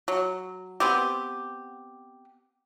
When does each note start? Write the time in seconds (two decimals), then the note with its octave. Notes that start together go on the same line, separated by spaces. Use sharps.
0.08 F#3
0.80 B3 C4 G4